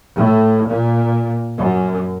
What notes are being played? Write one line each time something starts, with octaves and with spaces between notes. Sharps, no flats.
A2
A#2
F#2